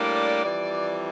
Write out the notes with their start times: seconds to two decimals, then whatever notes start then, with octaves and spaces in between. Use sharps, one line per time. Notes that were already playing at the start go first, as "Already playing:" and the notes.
Already playing: A2 G3 A#3 D4
0.15 D5
0.44 F2 E3 G3 D5